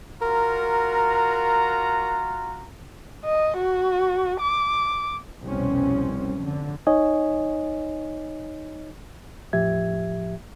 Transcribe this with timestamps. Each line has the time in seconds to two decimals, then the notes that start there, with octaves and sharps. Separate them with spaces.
0.22 F4 F#4 A#4 A#5
3.25 D#5
3.57 F#4
4.40 D6
5.45 C2 F2 B2 C4 C#4
6.39 F1 D3
6.87 D#4 C#5 D#5 G#5
9.53 E2 A2 F3 G4 E5 G#6